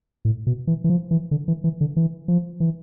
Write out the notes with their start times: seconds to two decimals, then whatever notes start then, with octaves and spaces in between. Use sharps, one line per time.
0.25 A2
0.47 B2
0.67 E3
0.84 E3
0.90 F3
1.11 E3
1.31 D3
1.48 E3
1.64 E3
1.81 D3
1.96 E3
2.28 F3
2.60 E3